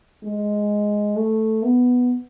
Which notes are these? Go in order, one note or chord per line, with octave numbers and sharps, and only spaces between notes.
G#3
A3
B3